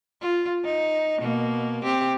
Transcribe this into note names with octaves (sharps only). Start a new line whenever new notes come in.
F4
D#4
B2 A#3
C4 G4